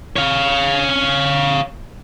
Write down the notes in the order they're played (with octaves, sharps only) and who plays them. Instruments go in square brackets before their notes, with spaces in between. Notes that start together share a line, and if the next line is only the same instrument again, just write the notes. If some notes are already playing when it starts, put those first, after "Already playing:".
[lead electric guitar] C#5 F5